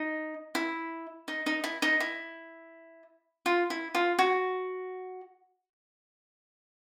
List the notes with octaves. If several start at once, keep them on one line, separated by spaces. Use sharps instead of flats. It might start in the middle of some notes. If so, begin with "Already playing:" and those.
Already playing: D#4
E4
D#4
D#4
E4
D#4
E4
F4
E4
F4
F#4